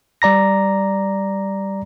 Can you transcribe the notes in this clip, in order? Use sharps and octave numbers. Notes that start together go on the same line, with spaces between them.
G3 D5 A#5 A#6